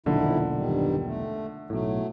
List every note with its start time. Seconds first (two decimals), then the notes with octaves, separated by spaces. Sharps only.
0.06 E1 B1 F2 A#2 D3 D#3 E4
0.55 G2 D#3 G3
1.06 A3
1.70 B1 A2 F#3 A3